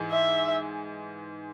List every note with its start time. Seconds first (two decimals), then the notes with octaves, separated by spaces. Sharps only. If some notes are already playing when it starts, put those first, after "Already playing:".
Already playing: G#2 E3 G#3
0.12 E5